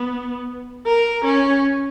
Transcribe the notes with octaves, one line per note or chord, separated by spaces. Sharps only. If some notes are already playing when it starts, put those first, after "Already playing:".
Already playing: B3
A#4
C#4